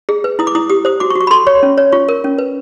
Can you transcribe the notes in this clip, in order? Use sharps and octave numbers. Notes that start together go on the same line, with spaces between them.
G#4
B4
E4 D#6
D6
E4 D#6
G4 D#6
C5 D#6
F#4 D6
C#6
F#4
C#6
B5
A4 C6
C#5 C#6
C#4
C#5
F4 C#6
A#4
C#4
B4